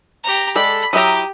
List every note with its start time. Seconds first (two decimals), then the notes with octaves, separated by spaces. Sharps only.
0.23 G4 A#5
0.56 G#3 G4 A4 D5 B5
0.93 F#3 E4 G4 E5 A#5 D#6